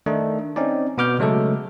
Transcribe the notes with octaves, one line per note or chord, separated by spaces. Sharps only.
D#3 A3 D4 D#4
C4 C#4 D#4 D5
B2 B3 D6 F6 G6
C#3 F#3 G#3 A3 A4